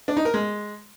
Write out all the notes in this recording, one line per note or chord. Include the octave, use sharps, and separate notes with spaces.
D4
D#4
A#4
G#3